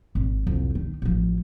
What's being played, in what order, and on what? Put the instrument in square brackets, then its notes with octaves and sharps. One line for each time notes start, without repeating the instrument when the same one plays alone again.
[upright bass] G#1
C2 F2
D#3
A1 F3